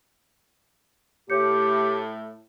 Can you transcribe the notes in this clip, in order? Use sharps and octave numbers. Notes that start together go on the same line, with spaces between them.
A2 G4 C#5 G6 C#7